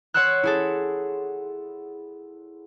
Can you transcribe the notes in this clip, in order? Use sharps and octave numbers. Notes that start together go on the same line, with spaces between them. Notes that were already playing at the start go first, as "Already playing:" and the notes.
C#5 F#5 C6 E6 F#6
E4 G#4 A4